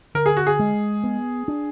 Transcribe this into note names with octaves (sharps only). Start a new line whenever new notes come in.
D3 A#4
G#4
F#4
G#4
G#3
B3
D4